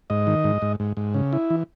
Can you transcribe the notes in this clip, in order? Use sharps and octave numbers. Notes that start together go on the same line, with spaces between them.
G#2 D#5
D#3
G#2
G#2
G#2
G#2
C#3
E4
E3